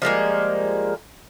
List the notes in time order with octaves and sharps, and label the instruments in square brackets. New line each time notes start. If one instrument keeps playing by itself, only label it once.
[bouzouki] F3 G3 G#3 A#3